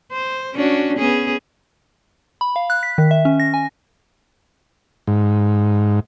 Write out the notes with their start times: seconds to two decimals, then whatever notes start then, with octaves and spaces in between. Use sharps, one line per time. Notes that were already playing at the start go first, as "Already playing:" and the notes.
0.13 C5
0.54 C#4 D4 F#4
0.97 B3 C#4 G#4
2.41 B5
2.56 F5
2.70 F#6
2.83 B6
2.98 D#3
3.11 E5
3.25 C#4
3.40 A#6
3.54 G#5
5.07 G#2